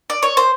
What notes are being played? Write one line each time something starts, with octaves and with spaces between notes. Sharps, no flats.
D5
C#5
C5